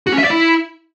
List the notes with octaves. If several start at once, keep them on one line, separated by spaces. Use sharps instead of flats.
F#4
C#4
E5
D5
E4